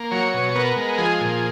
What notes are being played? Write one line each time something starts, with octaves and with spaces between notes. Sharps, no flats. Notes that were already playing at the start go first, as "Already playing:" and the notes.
Already playing: A#3
F#3 C#5
B2
B3 A#4
G#3
F3 G#4
A#2